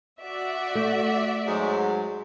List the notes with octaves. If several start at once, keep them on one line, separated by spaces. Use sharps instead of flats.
F#4 D5 E5
A3
G#2 F#3 G#3